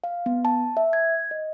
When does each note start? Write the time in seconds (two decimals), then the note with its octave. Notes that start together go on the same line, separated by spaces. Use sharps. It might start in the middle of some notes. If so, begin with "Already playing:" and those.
0.04 F5
0.26 B3
0.45 A5
0.77 E5
0.93 G#6
1.31 D#5